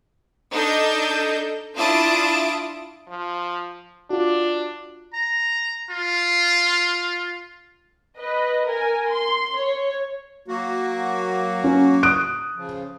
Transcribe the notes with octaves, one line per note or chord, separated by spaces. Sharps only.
D4 D#4 A4 D#5 G6
D4 E4 F4 A5 D#6 D7
F3
D4 F4 F#4
A#5
F4
B4 D#5
A#4 G#5
C6
C#5
F#3 A#3 F#4
C#4
D#6 F#6 D7
C#3 F3